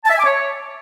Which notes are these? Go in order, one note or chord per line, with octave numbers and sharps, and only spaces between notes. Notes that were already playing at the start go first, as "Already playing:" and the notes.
A5
E5
G#5
D6
C#5